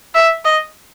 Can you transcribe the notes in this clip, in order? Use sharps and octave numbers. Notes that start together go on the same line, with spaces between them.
E5
D#5